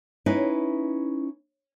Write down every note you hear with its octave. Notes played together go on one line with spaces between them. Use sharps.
C#4 D#4 E4 B4